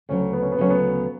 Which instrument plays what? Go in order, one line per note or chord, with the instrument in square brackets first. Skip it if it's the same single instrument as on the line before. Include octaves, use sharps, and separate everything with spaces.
[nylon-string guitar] D2 C#3 F#3 [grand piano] C#4
[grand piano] B3
C#4
B3
[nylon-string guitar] D2 C#3 F#3 [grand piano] C#4
[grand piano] B3